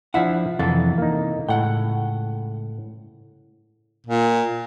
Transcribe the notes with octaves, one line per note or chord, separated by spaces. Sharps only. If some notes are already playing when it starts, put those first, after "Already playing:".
F3 D4 E4 E5 F#5
F2 C3 E3 A4 A5
A#3 D#4
C#2 A2 F#5 G5
A#2